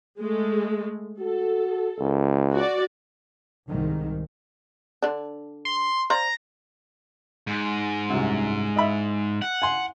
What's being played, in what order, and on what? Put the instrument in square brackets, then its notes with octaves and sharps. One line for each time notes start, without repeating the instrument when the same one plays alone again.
[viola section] G#3 A3
[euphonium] F#4 [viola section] A4
[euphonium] C#2
[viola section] F#4 D5
[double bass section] C2 G#2 D#3
[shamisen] D3 D4
[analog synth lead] C6
[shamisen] C5 D5 F5 [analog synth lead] A#5
[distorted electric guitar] G#2
[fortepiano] C2 F#2
D#5 E5 B5
[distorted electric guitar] F#5
[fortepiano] G#5 C6